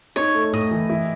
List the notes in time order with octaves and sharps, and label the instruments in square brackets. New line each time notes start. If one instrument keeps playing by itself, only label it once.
[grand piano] D#4 [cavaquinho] C#5
[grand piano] A3
[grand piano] A2 [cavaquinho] D#5
[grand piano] E3
E4